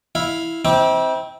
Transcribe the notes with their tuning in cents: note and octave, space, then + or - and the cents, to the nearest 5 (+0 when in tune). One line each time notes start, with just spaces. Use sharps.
E4 +0 F5 +5
C4 +0 E4 -45 D6 +0